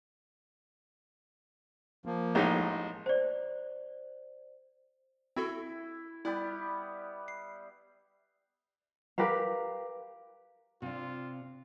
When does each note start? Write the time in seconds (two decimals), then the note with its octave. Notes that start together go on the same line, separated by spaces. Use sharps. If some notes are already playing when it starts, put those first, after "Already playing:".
2.06 F3 A#3
2.35 A1 G#3 D#4
3.06 C5 D5
5.36 C4 E4 F#4 A4
6.25 G3 B3 E4 G4
7.28 C7
9.18 G4 A#4 B4 F5
10.82 C3 D4 F4